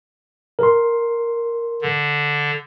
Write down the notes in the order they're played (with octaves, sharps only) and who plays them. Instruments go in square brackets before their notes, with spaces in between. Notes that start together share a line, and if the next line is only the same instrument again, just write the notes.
[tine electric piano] A#4 C6
[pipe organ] D3